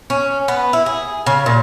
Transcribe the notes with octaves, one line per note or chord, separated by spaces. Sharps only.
C#4
B3
E4
G#4
C#3
A#2